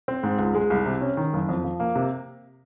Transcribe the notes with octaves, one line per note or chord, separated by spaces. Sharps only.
C4
G#2
C#2
G#3
C2
C3
C#4
D#3
F#1
F2
F3
A#3
C3